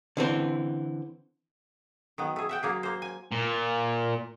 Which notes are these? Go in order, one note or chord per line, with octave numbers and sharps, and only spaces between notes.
D3 E3 C4
D#3 F#3 B3
A3 G#4
E5 F#5 G5
F#3 A#3 G#4
A#3 C5
G#5
A#2